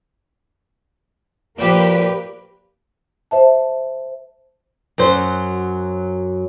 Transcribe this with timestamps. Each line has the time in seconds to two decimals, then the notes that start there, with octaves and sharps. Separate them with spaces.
1.59 A#2 F3 A#3 G4 B4
3.31 C5 E5 A5
4.98 F#2 F#3 C5